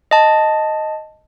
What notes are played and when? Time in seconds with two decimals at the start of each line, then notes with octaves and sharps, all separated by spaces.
0.11 D#5 A5